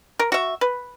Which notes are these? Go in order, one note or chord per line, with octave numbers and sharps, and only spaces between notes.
A#4
F#4 E5
B4